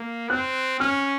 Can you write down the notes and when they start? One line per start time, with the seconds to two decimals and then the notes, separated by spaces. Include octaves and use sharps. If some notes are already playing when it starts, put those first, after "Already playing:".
Already playing: A#3
0.30 C4 F#6
0.79 C#4 F6